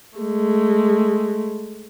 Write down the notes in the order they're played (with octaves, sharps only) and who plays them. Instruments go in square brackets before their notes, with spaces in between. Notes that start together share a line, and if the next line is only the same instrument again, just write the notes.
[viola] G#3 A3